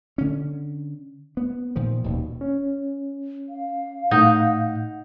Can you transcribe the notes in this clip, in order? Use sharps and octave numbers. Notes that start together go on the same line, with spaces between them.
D3 C#4
B3
A#2 D#3 F3
D#1 D#2 B2
C#4
F5
A2 D#4 F#5 G6